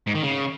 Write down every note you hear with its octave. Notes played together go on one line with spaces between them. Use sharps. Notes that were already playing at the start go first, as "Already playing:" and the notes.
G#2
D#3
C#3